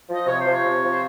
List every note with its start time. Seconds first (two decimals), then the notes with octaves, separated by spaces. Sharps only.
0.08 F3
0.14 D#5
0.26 C3 C#5
0.40 F3 C5
0.53 C#5
0.64 C3
0.83 F3
0.90 C5